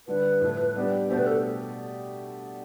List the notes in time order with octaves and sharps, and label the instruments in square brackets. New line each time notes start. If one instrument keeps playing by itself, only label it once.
[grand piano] D3 G3 D4 G4 [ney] B4
[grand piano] A2 F3 A3
G3 B3 D4 G4
[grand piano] B2 A3 D4 G4 [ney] C5
[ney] B4
A4